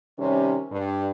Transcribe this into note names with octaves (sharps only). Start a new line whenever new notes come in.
C3 D#3 G3 C#4
G2